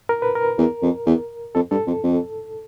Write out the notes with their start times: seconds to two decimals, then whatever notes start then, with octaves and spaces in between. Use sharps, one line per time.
0.09 A#4
0.22 B4
0.35 A#4
0.58 E2
0.82 F2
1.06 E2
1.55 F2 A4
1.71 G2 A4
1.87 F2
2.03 F2